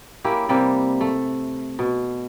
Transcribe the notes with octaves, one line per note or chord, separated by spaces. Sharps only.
A#3 C#4 E4 G4
C3 G3 A#3
A3
B2